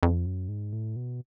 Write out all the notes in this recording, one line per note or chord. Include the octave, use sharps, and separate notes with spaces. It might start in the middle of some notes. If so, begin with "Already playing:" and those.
F2
F#2
G#2
A2
B2